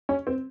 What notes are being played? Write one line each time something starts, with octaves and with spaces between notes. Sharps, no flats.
C#4
C4